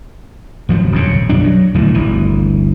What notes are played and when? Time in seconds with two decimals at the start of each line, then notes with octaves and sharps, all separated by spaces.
0.69 G#1 F3 F#3
0.92 D#1 F2 C#3
1.29 B1 F#2 G3 D4
1.44 F#3
1.74 D#1 D2 A2 E3
1.94 G1 D2 E3